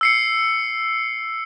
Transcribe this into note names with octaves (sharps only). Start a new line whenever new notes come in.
E6 C7 C#7